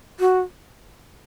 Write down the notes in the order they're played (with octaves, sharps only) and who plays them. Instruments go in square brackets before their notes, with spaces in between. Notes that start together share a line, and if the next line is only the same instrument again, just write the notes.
[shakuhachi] F#4